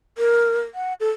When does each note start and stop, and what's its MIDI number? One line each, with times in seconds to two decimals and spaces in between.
0.18 0.61 70
0.75 0.94 78
1.00 1.09 69